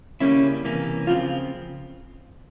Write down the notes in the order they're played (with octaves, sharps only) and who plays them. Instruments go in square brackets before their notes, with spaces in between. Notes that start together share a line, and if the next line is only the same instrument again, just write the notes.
[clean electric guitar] C#3 G3 A#3 E4 [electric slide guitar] C#4
[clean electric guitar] C3 E3 A#3 C#4
[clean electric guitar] C#3 F3 C4 [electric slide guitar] F4